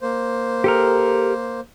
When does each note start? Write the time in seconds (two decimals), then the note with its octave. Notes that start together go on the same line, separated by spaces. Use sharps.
0.01 A#3 C5
0.64 G4 A4 A#4